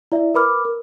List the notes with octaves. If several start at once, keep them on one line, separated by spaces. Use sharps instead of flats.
E4 D5 E5
A#4 B4 B5 D6 F6
A#4